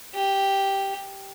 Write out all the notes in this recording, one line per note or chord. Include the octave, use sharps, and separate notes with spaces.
G4